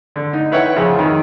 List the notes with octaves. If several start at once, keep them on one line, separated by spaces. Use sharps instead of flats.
D3
D#4
E4 B4 C#5 E5 F#5 G5
F2 C#3 F4
D#3